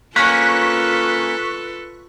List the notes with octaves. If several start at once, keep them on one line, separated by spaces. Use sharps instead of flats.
A#3 C#4 F4 A4 B4 C#6 F#6 B6